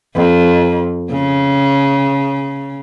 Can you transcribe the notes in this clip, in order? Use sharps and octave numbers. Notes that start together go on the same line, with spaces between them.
F2
C#3